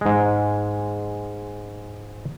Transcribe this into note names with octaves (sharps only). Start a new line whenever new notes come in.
G#2 G#3